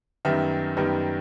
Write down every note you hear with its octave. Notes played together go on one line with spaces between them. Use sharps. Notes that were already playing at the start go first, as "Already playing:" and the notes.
F#2 D#3 G3 B3 E5
F#2 D#3 G3 B3